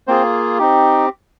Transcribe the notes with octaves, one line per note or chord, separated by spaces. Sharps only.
A#3 C4 F4 G#4 C5
C4 D#4 G4